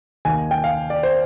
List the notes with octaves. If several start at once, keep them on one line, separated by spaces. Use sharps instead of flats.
D#2 D#3 A#3 G#5
G5
F5
D5
C5